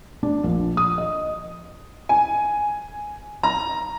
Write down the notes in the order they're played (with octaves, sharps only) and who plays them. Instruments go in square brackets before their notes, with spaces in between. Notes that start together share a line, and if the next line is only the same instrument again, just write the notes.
[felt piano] D4
A#1
D#6
D#5
[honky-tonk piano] G#5
A#5